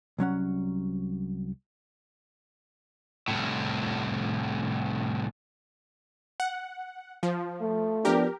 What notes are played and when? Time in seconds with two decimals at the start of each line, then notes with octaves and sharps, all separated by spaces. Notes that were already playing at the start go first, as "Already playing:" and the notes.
0.19 C2 F#3 C#4 F#5
3.28 C2 A2
6.40 F#5
7.23 F3
7.61 A3
8.05 F3 B3 D4 G4 A#4